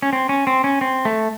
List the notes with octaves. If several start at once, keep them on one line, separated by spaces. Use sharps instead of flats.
C#4
C4
C#4
C4
C#4
C4
A3